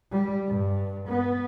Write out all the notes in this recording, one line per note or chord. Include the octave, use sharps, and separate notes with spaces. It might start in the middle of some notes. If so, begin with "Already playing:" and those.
G3
G2
B3